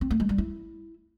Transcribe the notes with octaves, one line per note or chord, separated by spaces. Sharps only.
C4
A3
G#3
G3
E4